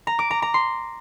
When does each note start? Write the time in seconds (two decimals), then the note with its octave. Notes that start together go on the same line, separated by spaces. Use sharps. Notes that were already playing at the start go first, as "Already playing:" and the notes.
0.07 A#5
0.19 D6
0.31 A#5
0.42 A#5
0.54 C6